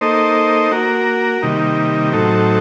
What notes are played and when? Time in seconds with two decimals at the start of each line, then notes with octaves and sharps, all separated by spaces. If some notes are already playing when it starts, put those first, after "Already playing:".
0.01 A#3 D#4 A4 C5 D#5
0.71 A#3 F#4 A#4
1.42 C3 D#3 G3 A#3 D#4
2.13 A2 F#3 C4 D#4 A4